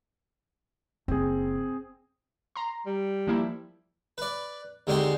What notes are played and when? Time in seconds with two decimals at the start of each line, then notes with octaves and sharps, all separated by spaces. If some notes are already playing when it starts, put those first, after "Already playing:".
1.08 F#1 C4 G#4
2.56 A#5 C6
2.86 G3
3.27 F3 A#3 E4
4.18 B4 D5
4.87 D#2 D3 G#3 C4 G4 C6